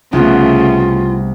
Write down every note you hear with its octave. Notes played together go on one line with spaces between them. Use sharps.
C2 C#3 A3 B3 F4